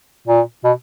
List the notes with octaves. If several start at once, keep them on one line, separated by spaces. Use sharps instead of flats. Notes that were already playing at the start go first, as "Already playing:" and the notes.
A#2
B2